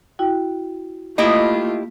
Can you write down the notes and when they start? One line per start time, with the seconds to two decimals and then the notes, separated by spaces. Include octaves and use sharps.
0.19 E4 F#4 G5
1.18 A3 A#3 E4 F4 G4 D#5 B5